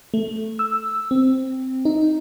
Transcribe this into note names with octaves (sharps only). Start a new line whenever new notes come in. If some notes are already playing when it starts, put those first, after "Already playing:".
A3
E6
C4
D#4